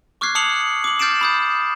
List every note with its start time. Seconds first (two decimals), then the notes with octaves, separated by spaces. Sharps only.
0.21 C#6 D6 F6 F#6 G#6 C7
0.35 A5 D#6 C7 C#7 F7 F#7
0.84 D6 F#7
0.99 F6 G6 A6 C7 D7 E7
1.21 B5 D#6 G6